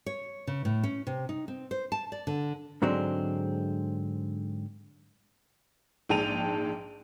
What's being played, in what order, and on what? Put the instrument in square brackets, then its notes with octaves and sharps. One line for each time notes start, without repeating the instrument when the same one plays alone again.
[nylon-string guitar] C#5
C#3
A2
C#4
C3
D#4
C4
C5
A5
D5
D3
[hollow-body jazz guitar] G#2 D3 F#3 G#3 C4
[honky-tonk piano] A#1 G#2 G5 A5 D#7 F7